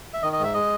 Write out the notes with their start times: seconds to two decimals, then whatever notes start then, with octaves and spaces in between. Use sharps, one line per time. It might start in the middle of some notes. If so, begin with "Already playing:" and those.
0.14 E5
0.22 D#3 D#5
0.33 D#5
0.39 G#2 E5
0.54 G#3 D#5